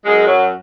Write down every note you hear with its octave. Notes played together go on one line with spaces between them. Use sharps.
F#2 G#3
F#3